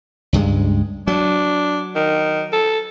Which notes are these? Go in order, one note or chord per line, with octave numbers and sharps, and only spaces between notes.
C#2 G2 G#3
F#3 D4
D#3
A4